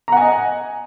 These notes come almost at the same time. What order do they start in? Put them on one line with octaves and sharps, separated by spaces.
A#5 F#5 G#5 D#5